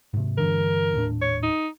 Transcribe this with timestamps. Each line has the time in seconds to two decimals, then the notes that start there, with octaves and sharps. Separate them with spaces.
0.13 G#2 C3
0.38 G2 D3 E3 A#4
0.94 D#1 A2 D4
1.22 C#5
1.43 D#4